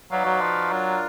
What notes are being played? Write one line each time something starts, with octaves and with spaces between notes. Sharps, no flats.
F#3 D#4 F#4 B4 D5 F5
F#3
F3
F#3 D4 F4 A#4